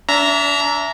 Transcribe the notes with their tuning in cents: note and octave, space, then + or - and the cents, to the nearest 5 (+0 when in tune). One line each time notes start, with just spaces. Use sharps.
D4 -35 E5 +10 A#5 +0